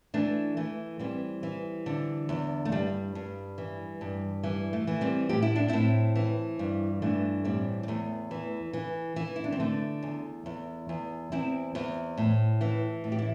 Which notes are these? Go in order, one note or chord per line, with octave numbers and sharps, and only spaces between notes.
E3 A3 D4
E3 A3
E3 G3 C4
E3
D3
E2
A3
G2 G3
G2
E3
G2
E3 G3
A3
E3
G3 C4
A2 G4
E4
D4
A2 C4 E4
E3
G2
E3 A3 D4
A2 G3 C4
G3
E2 A3
E3
E3
E3
E4
D4
C4
D3 A3
E2
E2
E2
E2 C4 E4
E2
A2
E3
A2
G4
E4